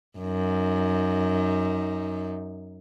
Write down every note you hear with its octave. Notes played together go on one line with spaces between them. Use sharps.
F#2 D#4